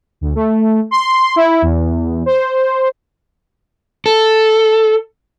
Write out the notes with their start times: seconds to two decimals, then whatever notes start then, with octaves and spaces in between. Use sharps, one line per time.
0.21 D2
0.35 A3
0.91 C6
1.36 E4
1.62 E2
2.26 C5
4.06 A4